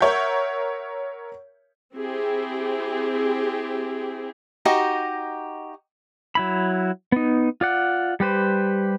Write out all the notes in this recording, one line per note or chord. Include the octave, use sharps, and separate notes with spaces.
A#4 C#5 E5 F#5 G6
C4 E4 G4 G#4
D#4 F#4 G4 D#5
F#3 E4 B5
B3 D#4
F4 D5 F#5
G3 G4 B4 C5